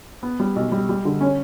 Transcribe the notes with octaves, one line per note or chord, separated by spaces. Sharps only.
B3
G3
B1
G3
G3
D3
C#4